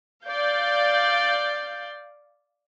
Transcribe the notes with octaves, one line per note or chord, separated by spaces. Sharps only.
D5 F5 G6